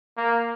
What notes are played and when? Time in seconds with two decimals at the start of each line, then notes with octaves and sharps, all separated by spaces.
0.17 A#3